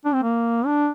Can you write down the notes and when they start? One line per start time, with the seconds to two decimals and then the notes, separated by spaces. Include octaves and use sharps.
0.05 D4
0.14 C4
0.23 A#3
0.66 D4